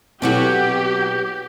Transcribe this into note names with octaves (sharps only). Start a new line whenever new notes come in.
B2 F#3 C4 E4 F#4 G4 A4